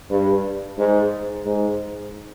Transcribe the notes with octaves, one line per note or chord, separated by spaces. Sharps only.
G2
G#2
G#2